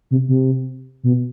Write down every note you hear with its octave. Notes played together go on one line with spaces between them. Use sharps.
C3
C3
B2